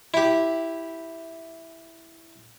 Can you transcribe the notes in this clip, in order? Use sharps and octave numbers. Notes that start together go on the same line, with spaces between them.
E4 G4